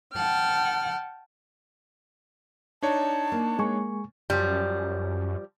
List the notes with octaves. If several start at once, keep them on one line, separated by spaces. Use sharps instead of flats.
F#5 G5 A5 F6
D4 D#4 C#5 A5
A#3
G#3 A#3 G#5 C#6
F#2 F3 G3